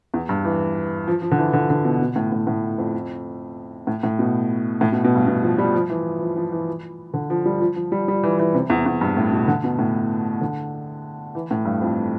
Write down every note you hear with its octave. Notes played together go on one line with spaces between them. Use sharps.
E2
G2
E3
F3
F3
D3
E3
D3
D3
B2
B2
A2
A2
A2
F2
A2
A2
B2
A2
B2
B2
G2
B2
F3
G3
F3
E3
F3
F3
E3
D3
F3
G3
F3
F3
G3
G3
E3
E3
C3
E2
E2
G2
A2
B2
D3
B2
A2
D3
E3
A2
G2
F2